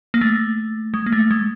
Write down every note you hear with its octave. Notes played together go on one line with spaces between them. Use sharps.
A#3
A3
G#3
A#3
A3
G#3